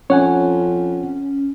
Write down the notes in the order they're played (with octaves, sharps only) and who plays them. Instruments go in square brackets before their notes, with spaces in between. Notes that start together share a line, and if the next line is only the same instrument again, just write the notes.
[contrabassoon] F2 [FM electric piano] C#4 [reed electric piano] C#5 F#5 G#5